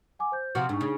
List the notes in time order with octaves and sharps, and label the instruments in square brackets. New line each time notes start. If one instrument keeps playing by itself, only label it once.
[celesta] F#5 G#5 D6
C5 G6
[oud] C3 F3 F#4
[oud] G#2 [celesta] D4 D#4 C#6
[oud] C#3